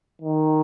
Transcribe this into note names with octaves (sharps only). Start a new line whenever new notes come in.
D#3